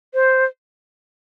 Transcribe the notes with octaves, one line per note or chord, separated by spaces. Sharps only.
C5